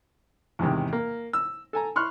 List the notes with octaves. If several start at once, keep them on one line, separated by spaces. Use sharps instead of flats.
E2 G#2 C3 D#3
A#3
E6
A4 G#5 A#5
E4 C6 C#6 F6 F#6